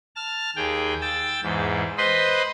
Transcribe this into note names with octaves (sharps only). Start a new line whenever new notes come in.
A5 F6
D#2 G#4 G5
G5 E6 A6
E2 G#2
B4 C5 D#5 B5 C6